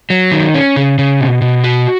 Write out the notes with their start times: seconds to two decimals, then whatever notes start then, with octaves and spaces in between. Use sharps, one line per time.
0.10 F#3
0.32 D#3
0.54 C#4
0.76 C#3
0.99 C#3
1.20 B2
1.42 B2
1.64 F#4